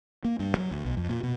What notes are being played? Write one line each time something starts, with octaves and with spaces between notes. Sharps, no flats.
A#3
G2
F#3
D2
B1
F2
A#2
B2